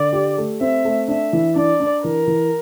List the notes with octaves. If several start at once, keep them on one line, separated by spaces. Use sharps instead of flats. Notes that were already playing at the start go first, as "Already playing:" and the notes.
Already playing: D3 D5
G4
A3
C4 E5
A3
D4 E5
E3
D4 D5
D4
E3 A#4
E3